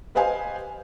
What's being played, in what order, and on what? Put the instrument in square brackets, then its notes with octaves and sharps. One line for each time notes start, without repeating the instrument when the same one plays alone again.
[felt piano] G4 B4 C5 D#5 F5 G#5